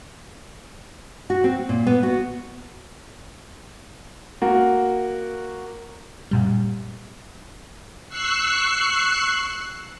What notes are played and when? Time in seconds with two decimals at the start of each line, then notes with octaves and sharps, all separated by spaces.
1.30 F#4
1.44 C4
1.69 A#2
1.87 B3
2.03 F#4
4.42 A#3 F#4
6.31 F#2 A#2 G3
8.08 C#6 E6 F#6 C7